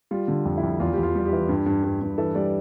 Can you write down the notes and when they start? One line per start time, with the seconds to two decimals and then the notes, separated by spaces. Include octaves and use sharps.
0.11 G3 F4
0.28 D3
0.45 F2
0.57 E4
0.63 F2
0.80 E2 F4
0.93 E2 G4
1.03 F4
1.15 G3
1.26 G4
1.33 E3
1.49 G2
1.66 G2
1.83 G2
2.01 G2
2.18 E3 A4
2.35 G3 D5